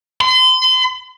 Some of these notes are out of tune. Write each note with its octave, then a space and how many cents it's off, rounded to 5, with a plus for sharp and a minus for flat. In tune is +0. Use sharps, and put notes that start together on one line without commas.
C6 -40